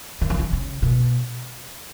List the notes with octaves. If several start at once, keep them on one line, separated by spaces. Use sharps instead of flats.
D3
E3
D3
C#3
B2